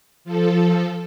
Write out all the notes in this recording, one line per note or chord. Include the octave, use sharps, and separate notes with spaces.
F3 A4